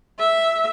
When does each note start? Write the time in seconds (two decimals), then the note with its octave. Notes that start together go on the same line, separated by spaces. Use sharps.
0.19 E5